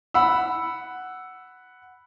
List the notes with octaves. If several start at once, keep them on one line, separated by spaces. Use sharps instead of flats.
F#5 B5 E6